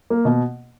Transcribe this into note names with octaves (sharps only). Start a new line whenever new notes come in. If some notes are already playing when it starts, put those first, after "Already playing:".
A#3
B2